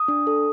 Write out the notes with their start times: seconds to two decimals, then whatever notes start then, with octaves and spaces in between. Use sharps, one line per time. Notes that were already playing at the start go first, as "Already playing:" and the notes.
Already playing: D#6
0.08 D4
0.27 A4